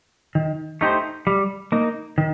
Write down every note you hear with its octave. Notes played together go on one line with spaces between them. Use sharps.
D#3
A3 D#4 G4 C5
G3
A#3 D#4
D#3